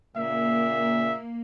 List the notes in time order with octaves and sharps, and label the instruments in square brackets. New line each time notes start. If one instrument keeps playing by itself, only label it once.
[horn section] A#2 C#3 E5 [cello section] A#3